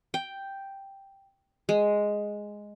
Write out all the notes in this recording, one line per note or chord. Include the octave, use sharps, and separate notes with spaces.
G5
G#3